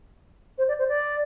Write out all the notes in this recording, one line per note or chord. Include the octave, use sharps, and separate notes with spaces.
C5
D5
C5
D5